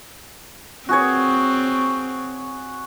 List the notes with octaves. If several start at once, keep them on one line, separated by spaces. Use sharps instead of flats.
C4 F#4 G#4 C#5